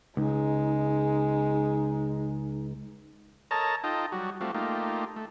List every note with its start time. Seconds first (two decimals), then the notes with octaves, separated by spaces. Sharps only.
0.17 C#2 G#3 D#4
3.51 A4 A#4 C#5 D#5 A5 A#5
3.84 D#4 F4 A4 D#5 G5
4.12 F#3 G3 F#4
4.41 G3 A3 C4 F4 F#4
4.54 A3 A#3 D#4 F4 G4
5.16 A3